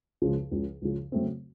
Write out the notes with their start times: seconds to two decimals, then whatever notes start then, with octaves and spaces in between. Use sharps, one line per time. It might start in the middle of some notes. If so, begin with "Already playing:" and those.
0.22 C#2 C#3 F3
0.51 C#2 C#3 F3
0.82 C#2 C#3 F3
1.12 C#3 F#3 A3 C4